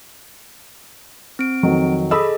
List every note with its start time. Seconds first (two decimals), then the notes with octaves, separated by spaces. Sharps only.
1.39 C4 D7
1.63 F2 D#3 F#3
2.11 G#4 A4 D#5 B5 D#6 E6